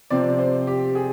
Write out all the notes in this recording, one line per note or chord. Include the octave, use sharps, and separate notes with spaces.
C3 F3 C4 D5
C5
G4
G#4